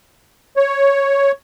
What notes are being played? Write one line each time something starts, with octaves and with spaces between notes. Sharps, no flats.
C#5